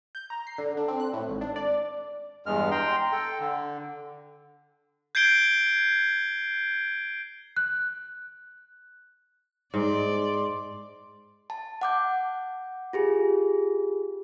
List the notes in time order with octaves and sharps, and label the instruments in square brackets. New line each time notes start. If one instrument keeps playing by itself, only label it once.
[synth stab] G6
A#5
C7
D3
D4
C4
F#6
A2
G#1
D4
D5
[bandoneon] E2 G2 G#3 F6
G5 A#5 C6
A4 G5
D3
[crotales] G6 G#6 C7 D7 G7
[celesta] F#6
[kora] G#2 [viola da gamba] D5 [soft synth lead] C6
[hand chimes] A5
F#5 D6 G6
F4 G4 G#4